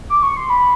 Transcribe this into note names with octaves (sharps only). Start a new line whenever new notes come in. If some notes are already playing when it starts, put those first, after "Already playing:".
D6
C#6
C6
B5